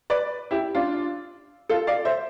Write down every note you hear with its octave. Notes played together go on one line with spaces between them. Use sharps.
B4 D5
E4 G4
D4 F4
F4 A4
D5 F5
C5 E5